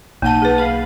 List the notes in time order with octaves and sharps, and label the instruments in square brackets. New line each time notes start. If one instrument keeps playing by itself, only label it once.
[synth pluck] B1 D#7 [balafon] A#3 F#5 A5
[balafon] G#4 B4
[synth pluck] F5 B5